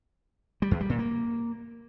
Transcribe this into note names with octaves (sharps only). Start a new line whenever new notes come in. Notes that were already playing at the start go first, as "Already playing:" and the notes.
G3
E2
G3
A#2
A#3